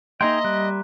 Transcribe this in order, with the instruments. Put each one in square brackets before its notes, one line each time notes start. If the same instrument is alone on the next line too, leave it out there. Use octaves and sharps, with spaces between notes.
[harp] A#3 E5 A#5 [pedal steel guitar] D#4 G#4 G5 [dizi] D#5 [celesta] C6
[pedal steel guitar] G3 [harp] F#6